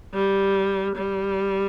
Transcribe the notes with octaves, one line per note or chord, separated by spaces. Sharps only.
G3
G3